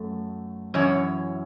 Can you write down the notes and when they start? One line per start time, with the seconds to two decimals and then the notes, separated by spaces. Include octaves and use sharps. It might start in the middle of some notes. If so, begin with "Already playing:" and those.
Already playing: F#2 A3
0.74 F#2 E3 C#5